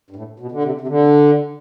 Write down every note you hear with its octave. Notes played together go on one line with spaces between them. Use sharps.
G2
A2
B2
D3
C3
C3
D3